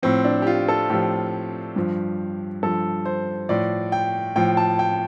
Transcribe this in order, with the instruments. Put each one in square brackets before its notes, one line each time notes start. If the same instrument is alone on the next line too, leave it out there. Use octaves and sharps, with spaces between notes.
[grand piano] A2 F3 C4
D4
G4
F4
A4
A2 F3 G4
G2 F3
G2 F3 A4
C5
A2 F3 D5
G5
A2 F3 G5
A5
G5